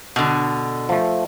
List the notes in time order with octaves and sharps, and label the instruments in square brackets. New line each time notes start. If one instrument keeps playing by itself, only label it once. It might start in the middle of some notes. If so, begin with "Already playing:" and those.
[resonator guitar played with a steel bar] B2 D3
[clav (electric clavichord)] F3 A3